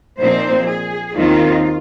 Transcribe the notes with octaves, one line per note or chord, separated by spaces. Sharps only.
A#2 F3 C4 D#4 C5
G#4
D#2 D#3 C4 D#4 F4